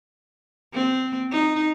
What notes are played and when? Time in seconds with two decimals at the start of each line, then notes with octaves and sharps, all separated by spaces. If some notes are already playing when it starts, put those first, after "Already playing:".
0.73 C4
1.32 D#4